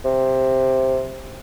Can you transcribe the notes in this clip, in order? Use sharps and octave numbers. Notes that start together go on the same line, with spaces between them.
C3